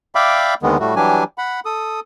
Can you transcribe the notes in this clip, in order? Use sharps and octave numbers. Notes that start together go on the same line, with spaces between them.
D5 E5 F5 G5 B5 D6
D#2 D3 D#3 G#3 B3
A2 G3 A3 F#4
E3 F#3 G3 D4 G4 G#5
F#5 B5
A4 D#6